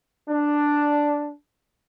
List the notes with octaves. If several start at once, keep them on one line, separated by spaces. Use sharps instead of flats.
D4